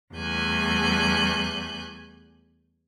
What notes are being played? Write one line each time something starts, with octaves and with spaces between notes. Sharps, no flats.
E2 G3 A3 G#5 F#6 G6